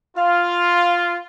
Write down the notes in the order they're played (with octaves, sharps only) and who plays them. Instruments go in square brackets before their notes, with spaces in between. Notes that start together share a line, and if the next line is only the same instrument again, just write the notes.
[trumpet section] F4 [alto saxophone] F5